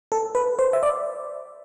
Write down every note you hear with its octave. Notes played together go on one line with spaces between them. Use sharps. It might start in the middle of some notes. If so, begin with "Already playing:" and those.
A4
B4
C5
E5
D5